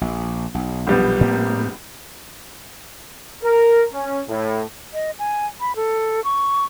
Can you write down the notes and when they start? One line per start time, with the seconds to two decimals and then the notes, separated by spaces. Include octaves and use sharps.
0.01 A#1
0.55 B1
0.87 A#1 G3 B3
1.21 A2 A#3 C4
3.44 A#4
3.93 C#4
4.29 A2
4.94 D#5
5.19 G#5
5.60 B5
5.76 A4
6.24 C#6